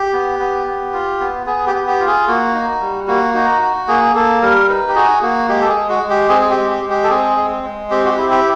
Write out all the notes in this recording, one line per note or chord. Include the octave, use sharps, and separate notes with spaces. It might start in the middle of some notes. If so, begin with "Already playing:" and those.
Already playing: G4
B3
B3
B3
F4
B3
B3 G#4
G4
B3
G4
F4
G#4
A#3 F#4
D#4
G3
A#3 F#4
D#4 F#4
F#4
A#3 G#4
A#3 A4
G3 A#4
D#4 B4
G4
F#4 G#4
A#3 F#4
G#3 G4
A4
G#4
G#3
F#4
G#3
G4
C4 G#4
G#4
G4
G#3
G4
G#3
G4
A4
C4 G#4
G#3
G#3
C4 G4
F#4
G4
E4
G4